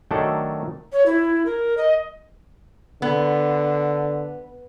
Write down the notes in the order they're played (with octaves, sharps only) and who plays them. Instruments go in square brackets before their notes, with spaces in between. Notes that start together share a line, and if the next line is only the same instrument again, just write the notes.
[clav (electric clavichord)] D#3 F#3 A3 D4 A4 D5
[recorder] C#5
E4
A#4
D#5
[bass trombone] D3 [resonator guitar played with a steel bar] B3